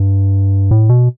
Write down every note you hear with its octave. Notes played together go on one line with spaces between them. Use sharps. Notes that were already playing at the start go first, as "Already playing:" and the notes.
Already playing: G2
A2
B2